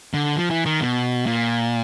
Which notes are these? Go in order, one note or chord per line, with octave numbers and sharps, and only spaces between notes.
D3
F3
E3
D#3
B2
A#2